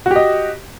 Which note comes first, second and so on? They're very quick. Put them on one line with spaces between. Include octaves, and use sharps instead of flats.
F#4 G4 D#5